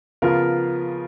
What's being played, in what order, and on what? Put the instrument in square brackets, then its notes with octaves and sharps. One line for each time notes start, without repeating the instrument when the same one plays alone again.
[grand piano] C#3 F3 B3 F4 A#4